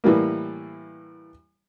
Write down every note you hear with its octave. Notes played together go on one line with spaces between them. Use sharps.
A2 E3 G3 A#3